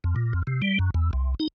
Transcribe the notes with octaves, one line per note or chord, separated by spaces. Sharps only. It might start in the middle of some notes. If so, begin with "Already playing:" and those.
F2
A#2
F2
C3
G3
F#2
E2
C2
D#4